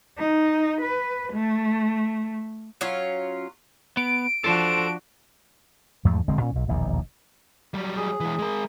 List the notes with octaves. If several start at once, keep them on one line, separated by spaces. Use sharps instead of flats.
D#4
B4
A3
F#3 C#4 F4 F5
B3 D7
F3 D4 F#4 A4 C5
E2 G#2 F3 A3
E1 D3 G#3 C4
A#2 C#4
B1
E1 A#1 D#2 D#3
F#3 G3
G#4
E3 G#3
G#3 A#4